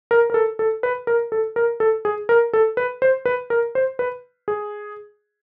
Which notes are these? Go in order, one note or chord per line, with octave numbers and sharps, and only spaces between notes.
A#4
A#4
A4
A4
B4
A#4
A4
A#4
A4
G#4
A#4
A4
B4
C5
B4
A#4
C5
B4
G#4